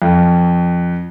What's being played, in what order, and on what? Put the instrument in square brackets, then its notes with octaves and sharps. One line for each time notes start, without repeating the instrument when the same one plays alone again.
[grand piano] F2